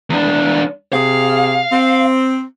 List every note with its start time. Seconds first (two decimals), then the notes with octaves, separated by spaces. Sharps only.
0.10 E2 D4
0.93 C3 G#4 F5
1.72 C4